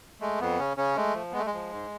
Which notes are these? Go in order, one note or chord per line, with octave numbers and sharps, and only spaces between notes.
G#3 A3
F2 B3
C#3 C#4
C#3 C#4
G#3 A3
F3
G#3 B3
A3
G#3
F3
G#2